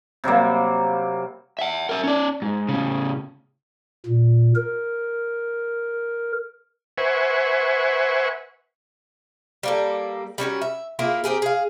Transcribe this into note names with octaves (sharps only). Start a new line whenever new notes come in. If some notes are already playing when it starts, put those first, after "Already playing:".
C3 F#3 G3 A#3
E5 F#5
A#4 E5
C#4 D5
G#2
A2 C#3
A#2
A#4
B4 C5 E5 F#5 G#5 C#6
G3 A#3 A4
G3 C#4 F#4 A#4
E5
A#3 E4 F4 G#4
C4 G4 G#4 A#4
G#4 F5